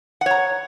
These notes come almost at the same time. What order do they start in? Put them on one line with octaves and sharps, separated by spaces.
F#5 C#5 A#5